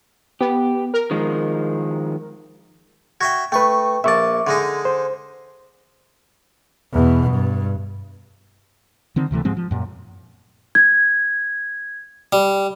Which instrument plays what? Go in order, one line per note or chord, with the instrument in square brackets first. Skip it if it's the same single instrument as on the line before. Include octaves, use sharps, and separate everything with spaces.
[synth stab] B3 [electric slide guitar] G4
[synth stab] A#4
[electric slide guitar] D#3 F3 G#3
[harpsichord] F#4 E5 G5 [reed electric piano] G#6
[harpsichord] A3 C#6 [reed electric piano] B4 G5
[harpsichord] A#1 A5 [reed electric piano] E5 C#6 D6
[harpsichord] D3 G#3 D#4
[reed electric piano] C5
[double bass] E2 B2
G2
[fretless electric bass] D3 D#3 C4
D2 C3 E3 A3
G#2 F3 G#3 C4
F3
F#2 A#2
[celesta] G#6
[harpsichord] G3